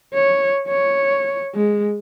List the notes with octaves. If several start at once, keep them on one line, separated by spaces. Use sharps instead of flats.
C#5
C#5
G#3